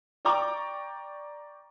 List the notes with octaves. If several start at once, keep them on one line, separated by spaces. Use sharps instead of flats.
D5 G5 A#5 C#6 D6